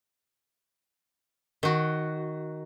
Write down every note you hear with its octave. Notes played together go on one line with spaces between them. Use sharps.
D#3 F#4